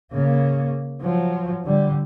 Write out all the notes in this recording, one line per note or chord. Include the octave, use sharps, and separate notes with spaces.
C#3 A#3
F3 F#3
D3 G3